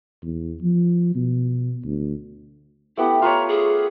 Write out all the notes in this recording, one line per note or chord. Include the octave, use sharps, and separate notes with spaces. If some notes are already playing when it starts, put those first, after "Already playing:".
E2
F3
B2
D2
A3 B3 E4 G4
F4 B4 C#5 A#5
G#4